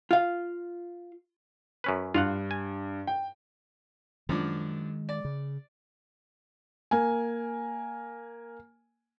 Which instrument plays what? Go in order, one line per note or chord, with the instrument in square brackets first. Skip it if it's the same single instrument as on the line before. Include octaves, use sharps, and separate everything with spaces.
[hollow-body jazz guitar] F4 F5
[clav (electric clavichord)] F#2 C#4 B4
[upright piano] G2 [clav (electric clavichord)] F4 F5 F#5
[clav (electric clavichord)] G#5
[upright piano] G5
[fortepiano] F#2 F3 D4 [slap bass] D#3 G#3
[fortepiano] D5
[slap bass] C#3
[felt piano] A#3 G#5